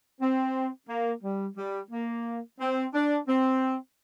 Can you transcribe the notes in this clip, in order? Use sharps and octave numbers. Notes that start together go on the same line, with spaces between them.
C4
A#3
G3
G3
A#3
C4
D4
C4